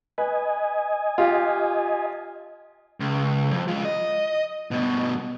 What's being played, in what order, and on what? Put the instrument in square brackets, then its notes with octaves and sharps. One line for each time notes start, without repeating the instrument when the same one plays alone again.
[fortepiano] B4 [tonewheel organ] D#5 G#5
[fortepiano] F4 G4
[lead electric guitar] C#2
F2
G#3 F4
D#5
G2 B2